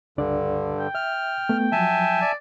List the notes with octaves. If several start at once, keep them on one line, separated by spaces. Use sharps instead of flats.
C#2 G2 D3 D4 D5
G5
E5 F6
A3 B3
F3 F#3 E5 G#5 A5
D5